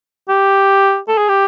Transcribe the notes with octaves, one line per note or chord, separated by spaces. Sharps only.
G4
A4
G#4
G4